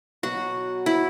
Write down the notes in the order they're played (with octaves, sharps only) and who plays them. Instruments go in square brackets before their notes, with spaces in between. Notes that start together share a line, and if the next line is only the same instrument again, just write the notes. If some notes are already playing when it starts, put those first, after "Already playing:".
[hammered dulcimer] B2 F#3 B3 [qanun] F#4
[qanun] E4